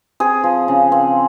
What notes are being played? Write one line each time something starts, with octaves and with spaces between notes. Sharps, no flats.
C4 G#4
F3
C#3
C4